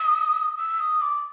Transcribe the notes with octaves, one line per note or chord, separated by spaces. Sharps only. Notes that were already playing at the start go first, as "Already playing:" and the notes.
Already playing: D#6
E6
D#6
D6